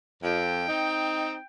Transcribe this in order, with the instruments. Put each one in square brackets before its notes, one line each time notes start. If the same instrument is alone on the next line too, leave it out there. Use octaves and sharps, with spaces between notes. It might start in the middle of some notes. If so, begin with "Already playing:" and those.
[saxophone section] F2 [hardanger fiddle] G5
[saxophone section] C4 D#4